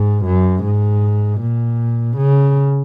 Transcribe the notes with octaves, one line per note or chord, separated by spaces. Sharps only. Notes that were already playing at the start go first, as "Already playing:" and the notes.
Already playing: G#2
F#2
G#2
A#2
C#3